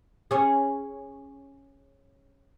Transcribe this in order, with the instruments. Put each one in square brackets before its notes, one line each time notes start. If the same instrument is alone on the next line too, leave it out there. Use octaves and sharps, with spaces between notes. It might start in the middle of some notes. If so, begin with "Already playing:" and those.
[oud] C#4 G#4